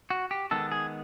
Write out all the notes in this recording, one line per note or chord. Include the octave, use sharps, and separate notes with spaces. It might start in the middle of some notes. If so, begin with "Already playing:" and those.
F#4
G4
D#3 G#3 B3 A4
G#4